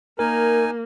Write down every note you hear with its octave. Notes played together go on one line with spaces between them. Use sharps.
A#3 D#4 A#4 G#5